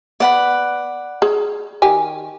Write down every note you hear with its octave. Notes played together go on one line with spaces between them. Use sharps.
B3 D5 F#5 B5
G#4 C#5
D#3 G4 G#5